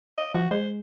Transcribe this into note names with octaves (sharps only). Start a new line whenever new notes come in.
D#5
F3 F#4
G#3 C5